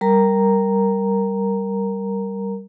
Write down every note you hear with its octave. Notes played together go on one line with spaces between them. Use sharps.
G3 A#4 A#5